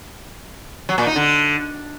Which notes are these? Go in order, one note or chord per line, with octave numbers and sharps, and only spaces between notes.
F#3
A#2
D#4
D3